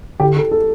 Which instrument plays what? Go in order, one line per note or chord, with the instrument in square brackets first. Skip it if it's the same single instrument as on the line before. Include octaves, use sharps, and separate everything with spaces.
[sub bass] D3 [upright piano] G4
[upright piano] A4
A4